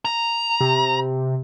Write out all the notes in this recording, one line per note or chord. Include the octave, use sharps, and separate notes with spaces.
A#5
C3